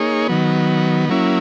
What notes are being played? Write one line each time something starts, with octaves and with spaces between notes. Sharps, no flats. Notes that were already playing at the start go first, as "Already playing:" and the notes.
Already playing: A#3 D#4 G#4 C#5
D#3 F#3 B3
F#3 A#3 C#4 E4